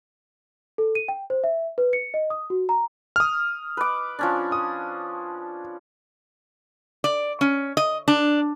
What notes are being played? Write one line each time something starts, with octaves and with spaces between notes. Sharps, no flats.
A4
D#7
G5
C5
E5
B4
C#7
D#5
D#6
F#4
A#5
D#6 F6
B4 D6
F3 C#4 D4
D#6
D5
C#4
D#5
D4